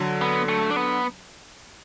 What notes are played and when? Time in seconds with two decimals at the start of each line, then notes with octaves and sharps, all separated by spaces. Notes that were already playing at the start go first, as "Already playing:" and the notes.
Already playing: D3 F#3
0.22 B3
0.49 A3
0.71 D4
0.76 B3